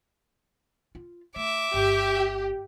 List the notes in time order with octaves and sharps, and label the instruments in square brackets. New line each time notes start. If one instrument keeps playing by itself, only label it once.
[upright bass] F4
[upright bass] A3 [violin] E5 D6
[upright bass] G1 [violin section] G4